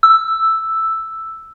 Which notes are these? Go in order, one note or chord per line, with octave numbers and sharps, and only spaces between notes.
E6